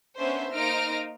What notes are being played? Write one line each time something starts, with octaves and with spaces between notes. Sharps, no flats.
B3 C#4 D4 C5 E5
A#3 D#4 C5 F6 A#6 D7